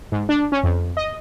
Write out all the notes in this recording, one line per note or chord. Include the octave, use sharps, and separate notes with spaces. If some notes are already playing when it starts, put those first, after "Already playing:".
G#2
D4
C#4
F2
D#5